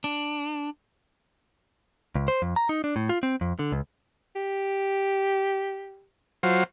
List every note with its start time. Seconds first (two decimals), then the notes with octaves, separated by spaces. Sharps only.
0.04 D4
2.15 C#2
2.28 C5
2.42 F2
2.56 A#5
2.69 D#4
2.84 D4
2.96 A2
3.09 F4
3.23 C4
3.41 F2
3.59 D3
3.72 C#2
4.36 G4
6.43 F#3 F4 C5